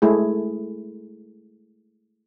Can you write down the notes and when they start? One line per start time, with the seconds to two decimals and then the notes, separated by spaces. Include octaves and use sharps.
0.02 G#3 A3 E4 G#4